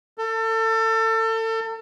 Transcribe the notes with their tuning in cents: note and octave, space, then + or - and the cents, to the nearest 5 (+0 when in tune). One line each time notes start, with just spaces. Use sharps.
A4 +30